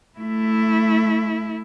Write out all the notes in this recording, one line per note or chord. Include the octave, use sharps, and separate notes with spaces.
A3 E4